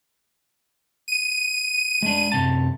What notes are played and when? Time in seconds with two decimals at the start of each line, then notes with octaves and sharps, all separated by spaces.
1.08 D#7
2.02 G#3 D4
2.32 F#2 C3 A5